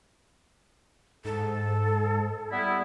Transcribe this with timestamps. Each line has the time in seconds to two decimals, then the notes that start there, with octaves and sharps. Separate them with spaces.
1.25 G#2 A4
2.51 G3 B3 E4